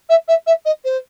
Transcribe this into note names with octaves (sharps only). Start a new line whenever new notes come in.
E5
E5
E5
D#5
C5